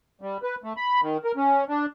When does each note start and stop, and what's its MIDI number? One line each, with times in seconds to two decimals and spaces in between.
0.21 0.38 55
0.43 0.55 71
0.64 0.73 57
0.77 1.01 83
1.02 1.17 51
1.24 1.32 70
1.36 1.64 61
1.69 1.86 62